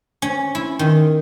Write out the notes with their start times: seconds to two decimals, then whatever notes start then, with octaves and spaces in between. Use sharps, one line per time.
0.22 C#4
0.55 E4
0.79 D#3